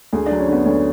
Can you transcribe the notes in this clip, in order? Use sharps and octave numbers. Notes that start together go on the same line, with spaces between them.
D2 G#4
F#3 D4
C#4
D3 B3
D2 C#4